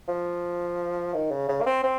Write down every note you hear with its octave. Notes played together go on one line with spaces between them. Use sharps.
F3
D#3
C#3
C#3
A#3
C4
C4